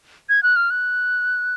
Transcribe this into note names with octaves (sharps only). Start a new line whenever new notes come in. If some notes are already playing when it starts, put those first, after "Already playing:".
G#6
F#6
F6
F#6